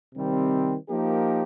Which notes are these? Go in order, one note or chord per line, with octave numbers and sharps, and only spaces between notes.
C3 D#3 G3 C4
F3 A#3 D#4 G4 A#4